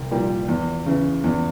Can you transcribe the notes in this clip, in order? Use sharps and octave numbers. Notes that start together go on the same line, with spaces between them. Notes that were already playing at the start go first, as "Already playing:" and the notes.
Already playing: C2
A#2 G3
E2
C#3 E3
E2